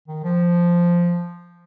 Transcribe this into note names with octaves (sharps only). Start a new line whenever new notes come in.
D#3
F3